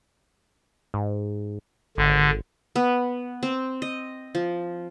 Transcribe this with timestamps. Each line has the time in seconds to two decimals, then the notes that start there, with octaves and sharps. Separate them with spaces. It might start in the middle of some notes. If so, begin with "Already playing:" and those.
0.94 G#2
1.97 G#1 D3
2.76 B3
3.43 C4
3.82 D#5
4.35 F3